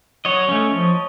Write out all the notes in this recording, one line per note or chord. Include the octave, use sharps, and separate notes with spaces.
F#3 C#5 D#5
A3 C#4
F3